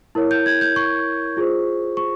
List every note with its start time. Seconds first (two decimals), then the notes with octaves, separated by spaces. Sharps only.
0.15 E4 A#4 C#5
0.31 G6
0.46 G#6
0.61 G6
0.76 C#6
1.37 F4 G#4 C5
1.97 C#6